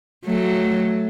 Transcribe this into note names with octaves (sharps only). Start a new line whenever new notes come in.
F#3 A3